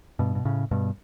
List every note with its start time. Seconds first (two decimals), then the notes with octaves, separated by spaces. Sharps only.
0.19 G2 B2
0.35 B2
0.45 A2 C#3
0.71 G2 B2